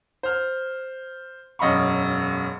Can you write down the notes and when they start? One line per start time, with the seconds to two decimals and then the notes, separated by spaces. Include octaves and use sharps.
0.23 C5 F6
1.59 E1 F#2 D#5 F5 B5 C#6